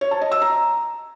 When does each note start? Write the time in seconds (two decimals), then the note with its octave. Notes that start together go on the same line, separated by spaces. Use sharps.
0.01 C#5
0.11 A5
0.21 D#5
0.32 E6
0.42 A#5